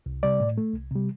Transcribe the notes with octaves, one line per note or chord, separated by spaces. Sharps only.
C2
C3 G3 D5
A2
A3
C2
C3 G3